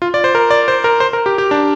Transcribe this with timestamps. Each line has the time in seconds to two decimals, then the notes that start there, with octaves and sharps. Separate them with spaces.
0.02 F4
0.14 D5
0.24 C5
0.35 A#4
0.50 D5
0.68 C5
0.84 A#4
1.00 C5
1.13 A#4
1.26 G4
1.38 G4
1.51 D4